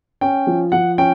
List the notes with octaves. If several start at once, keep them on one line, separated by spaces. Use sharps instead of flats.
C#4 G5
F3
F3 F#5
C#4 G5